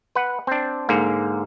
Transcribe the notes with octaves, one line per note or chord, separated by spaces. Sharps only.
B4 F#5
C4 D4
G#2 D3 A#3